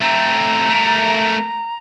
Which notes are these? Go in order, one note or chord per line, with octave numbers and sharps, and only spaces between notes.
A3 C4 A#5
A3 A#4